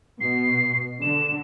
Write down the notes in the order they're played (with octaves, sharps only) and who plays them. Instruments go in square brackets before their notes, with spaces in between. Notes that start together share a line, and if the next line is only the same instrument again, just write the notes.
[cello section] B2 [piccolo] C7
[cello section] D3 [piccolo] E7